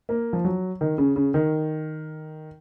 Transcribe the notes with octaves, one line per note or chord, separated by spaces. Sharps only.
A#3
F3
F#3
D#3
C#3
C#3
D#3